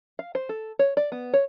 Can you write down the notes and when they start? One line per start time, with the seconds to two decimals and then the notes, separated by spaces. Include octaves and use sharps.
0.19 F5
0.35 C5
0.49 A4
0.79 C#5
0.97 D5
1.12 B3
1.34 C#5